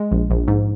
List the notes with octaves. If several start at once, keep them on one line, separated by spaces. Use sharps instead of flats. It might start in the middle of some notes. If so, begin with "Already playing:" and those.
Already playing: G#3
A#1
A#1
G#2